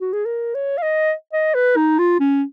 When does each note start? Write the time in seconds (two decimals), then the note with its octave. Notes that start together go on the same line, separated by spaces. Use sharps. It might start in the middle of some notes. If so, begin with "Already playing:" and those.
0.01 F#4
0.13 G#4
0.25 A#4
0.55 C#5
0.78 F5
0.83 D#5
1.33 D#5
1.55 B4
1.77 D#4
1.99 F4
2.20 C#4